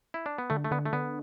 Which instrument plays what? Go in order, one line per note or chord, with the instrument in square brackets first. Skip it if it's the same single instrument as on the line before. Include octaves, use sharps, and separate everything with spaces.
[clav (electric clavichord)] E4
D4
B3
[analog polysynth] D3 [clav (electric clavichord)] A3
[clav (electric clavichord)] A3
[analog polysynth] D3 [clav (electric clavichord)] B3
[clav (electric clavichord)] A3
[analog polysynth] D3 [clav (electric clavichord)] B3